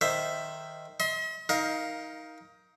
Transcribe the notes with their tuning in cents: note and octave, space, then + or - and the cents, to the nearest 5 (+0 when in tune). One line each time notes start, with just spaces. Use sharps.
D#3 +0 C5 +0 E5 +10
D#5 +45 C6 +0
D#4 +20 A#4 +10 F5 +0